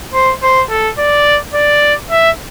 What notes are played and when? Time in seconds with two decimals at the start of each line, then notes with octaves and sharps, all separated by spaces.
0.13 C5
0.43 C5
0.70 A4
0.98 D5
1.54 D5
2.10 E5